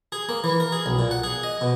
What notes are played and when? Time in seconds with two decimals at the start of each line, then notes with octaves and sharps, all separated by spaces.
0.12 G#4
0.29 A#3
0.44 E3
0.60 A#4
0.72 G#4
0.86 B1
0.99 A#2
1.11 F#5
1.24 G#4
1.43 D#5
1.61 B2